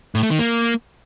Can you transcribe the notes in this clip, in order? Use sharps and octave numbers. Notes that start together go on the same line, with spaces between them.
A2
A3
D#3
A#3